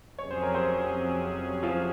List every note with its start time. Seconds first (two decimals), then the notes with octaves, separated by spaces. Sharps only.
0.18 F2 C3 F#3 C#4 G#4 C#5
0.31 C5
0.42 A#4
0.54 C4 C5
1.63 F3 F4